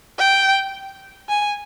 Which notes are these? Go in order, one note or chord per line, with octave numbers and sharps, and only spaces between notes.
G5
G#5